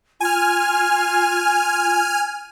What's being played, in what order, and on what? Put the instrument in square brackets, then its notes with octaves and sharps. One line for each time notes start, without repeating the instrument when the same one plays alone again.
[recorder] F4 [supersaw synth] G#5 F6